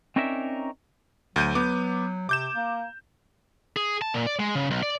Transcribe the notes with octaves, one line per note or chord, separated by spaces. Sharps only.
C4 C#4 D#4 A#4 D5 E5
D2 F#3 G6 D#7
B3 D6
C3 D6 G6 E7
A#3
G#4
A5
A#2
D5
G#3
C#3
B1
D5